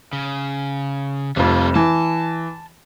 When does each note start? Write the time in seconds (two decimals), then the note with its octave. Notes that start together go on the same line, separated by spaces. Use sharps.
0.13 C#3
1.36 F1 F2 G3 F4
1.75 E3 A5